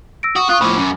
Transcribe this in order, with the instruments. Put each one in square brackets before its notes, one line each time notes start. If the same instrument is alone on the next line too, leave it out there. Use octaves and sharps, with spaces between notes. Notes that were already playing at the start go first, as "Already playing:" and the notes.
[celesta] E6 A#6 D7
[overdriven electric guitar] F#4 [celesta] D#6
[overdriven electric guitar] F4 [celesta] C#6 D#6 F#6
[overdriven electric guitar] A2 F3 [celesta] B5 D6
[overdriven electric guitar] F#2